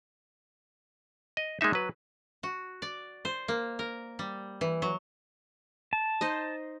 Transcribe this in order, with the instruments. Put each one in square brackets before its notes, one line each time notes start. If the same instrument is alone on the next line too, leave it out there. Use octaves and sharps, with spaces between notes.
[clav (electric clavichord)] D#5
G#3 A#3 D#4 E5
F#3 B4
[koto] F#4
D5
C5
A#3
A#4
G3
E3
F#3
[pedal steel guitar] A5
[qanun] D#4 C5 D#5